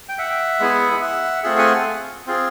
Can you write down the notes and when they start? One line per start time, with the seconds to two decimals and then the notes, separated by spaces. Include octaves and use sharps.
0.09 G5
0.18 E5 F#5
0.60 G#3 B3 E4 G#4
1.02 E5 F#5
1.43 A3 C4 F4 G#4 E5 F#5
1.58 F#5 G#5
2.27 C4 F4 G#4